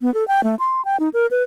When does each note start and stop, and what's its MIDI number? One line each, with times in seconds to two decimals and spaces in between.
0.01 0.13 59
0.14 0.26 69
0.28 0.43 79
0.44 0.55 57
0.59 0.84 84
0.85 0.97 79
1.00 1.09 63
1.14 1.27 70
1.31 1.43 71